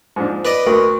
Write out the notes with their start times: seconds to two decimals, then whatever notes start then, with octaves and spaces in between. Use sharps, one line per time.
0.16 G#2 F3 D4
0.45 B4 D5 D#5
0.66 D2 F#4 A#4